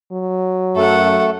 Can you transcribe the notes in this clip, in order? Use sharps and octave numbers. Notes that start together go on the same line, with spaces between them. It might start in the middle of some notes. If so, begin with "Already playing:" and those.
F#3
F#2 A3 A4 F#5